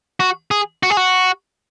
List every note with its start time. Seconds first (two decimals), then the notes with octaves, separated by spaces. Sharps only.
0.20 F#4
0.51 G#4
0.83 F#4
0.90 G#4
0.97 F#4